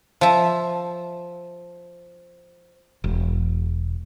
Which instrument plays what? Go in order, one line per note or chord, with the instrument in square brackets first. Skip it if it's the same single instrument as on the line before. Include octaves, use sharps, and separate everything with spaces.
[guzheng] F3 E5
[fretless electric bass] E1